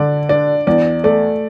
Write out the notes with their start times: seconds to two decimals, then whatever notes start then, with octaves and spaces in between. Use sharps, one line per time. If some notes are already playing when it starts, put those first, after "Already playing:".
Already playing: D3 D5
0.29 D4 D5
0.67 E2 D5
1.04 A3 D5